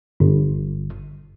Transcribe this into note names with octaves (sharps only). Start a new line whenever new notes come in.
G1